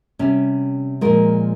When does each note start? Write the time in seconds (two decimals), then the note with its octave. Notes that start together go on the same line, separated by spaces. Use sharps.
0.19 C3 G3 C#4
1.01 A#2 F3 G#3 A#4